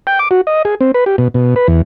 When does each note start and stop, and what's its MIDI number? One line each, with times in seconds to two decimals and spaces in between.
0.07 0.19 79
0.19 0.28 86
0.31 0.41 66
0.47 0.62 75
0.65 0.75 68
0.81 0.91 60
0.94 1.04 71
1.06 1.16 67
1.18 1.28 47
1.34 1.54 47
1.56 1.67 71
1.68 1.81 40